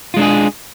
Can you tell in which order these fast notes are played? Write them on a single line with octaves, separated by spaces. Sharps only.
F4 G#3 D4 G#4